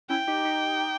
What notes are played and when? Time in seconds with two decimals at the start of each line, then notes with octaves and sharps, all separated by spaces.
0.10 C#4 E4 G5
0.27 D#4 G4
0.45 D#4 G4